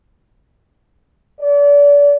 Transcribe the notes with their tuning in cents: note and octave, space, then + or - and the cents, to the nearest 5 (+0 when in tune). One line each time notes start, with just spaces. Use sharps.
D5 -35